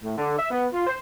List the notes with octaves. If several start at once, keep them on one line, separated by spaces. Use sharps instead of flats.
A2
D3
E5
B3
F4
C5